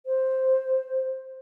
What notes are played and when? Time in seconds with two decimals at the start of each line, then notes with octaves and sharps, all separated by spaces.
0.06 C5